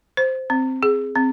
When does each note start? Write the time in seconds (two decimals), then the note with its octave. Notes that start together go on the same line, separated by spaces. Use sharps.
0.17 C5
0.50 C4
0.83 G#4
1.15 C4